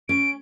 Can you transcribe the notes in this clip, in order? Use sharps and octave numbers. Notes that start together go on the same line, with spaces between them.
C#4 D7